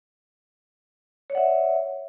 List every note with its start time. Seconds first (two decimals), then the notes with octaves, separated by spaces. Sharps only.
1.30 C#5
1.32 D5
1.35 F#5
1.38 E5